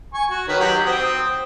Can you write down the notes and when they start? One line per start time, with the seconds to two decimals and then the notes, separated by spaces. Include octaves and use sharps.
0.14 G#5 C#6
0.30 F#4
0.48 D#3 B4 C#5
0.60 F#3 G4 F#5
0.86 C4 G5 D#6